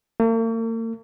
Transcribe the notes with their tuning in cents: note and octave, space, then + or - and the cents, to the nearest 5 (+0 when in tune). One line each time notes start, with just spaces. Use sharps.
A#3 -45